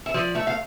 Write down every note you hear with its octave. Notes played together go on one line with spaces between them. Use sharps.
E5
F3 D5
A3 E5
F5